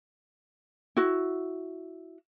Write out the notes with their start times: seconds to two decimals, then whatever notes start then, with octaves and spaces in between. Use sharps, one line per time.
0.97 E4 F#4